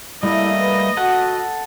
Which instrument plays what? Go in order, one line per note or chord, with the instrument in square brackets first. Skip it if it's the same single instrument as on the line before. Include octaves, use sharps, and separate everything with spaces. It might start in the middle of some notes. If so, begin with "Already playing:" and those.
[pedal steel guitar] G3 A3 A#3 [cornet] E4 [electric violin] D#5
[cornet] B4
[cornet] F#4 [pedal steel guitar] A4 F#5